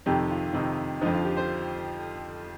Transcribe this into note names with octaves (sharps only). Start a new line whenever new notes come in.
F2 C3 D#3 G4
F4
F2 C3 D#3 D#4
F2 D3 F3 D#4
F4
G4
C5